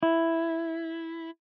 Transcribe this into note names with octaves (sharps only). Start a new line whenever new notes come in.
E4